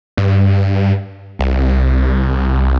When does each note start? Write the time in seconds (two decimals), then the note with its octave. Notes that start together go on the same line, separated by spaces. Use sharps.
0.17 G2
1.39 C2